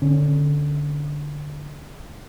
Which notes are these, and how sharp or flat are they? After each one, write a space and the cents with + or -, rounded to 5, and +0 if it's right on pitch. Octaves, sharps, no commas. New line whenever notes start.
D3 +0 C#4 -10